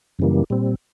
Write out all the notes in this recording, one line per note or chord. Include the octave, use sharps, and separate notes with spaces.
F#2 C#3 E3 G3 A#3
A#2 G3 C4